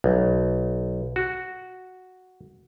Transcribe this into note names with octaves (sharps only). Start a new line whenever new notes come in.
B1
F#4